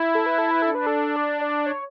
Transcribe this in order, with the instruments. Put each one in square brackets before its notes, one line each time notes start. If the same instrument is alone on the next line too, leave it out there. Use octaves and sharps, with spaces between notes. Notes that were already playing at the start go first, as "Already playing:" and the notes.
Already playing: [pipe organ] E4
[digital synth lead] A4
B4
A4
B4
[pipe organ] D4 [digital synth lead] A4
[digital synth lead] B4
A4
D5
D5
C#5